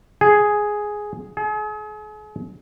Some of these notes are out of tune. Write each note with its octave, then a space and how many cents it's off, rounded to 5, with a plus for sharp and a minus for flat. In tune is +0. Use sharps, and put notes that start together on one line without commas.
G#4 +5
G#4 +40